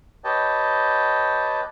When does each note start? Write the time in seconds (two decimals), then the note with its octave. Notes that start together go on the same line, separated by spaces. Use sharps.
0.24 G4 B4 C#5 D#5 G5 A5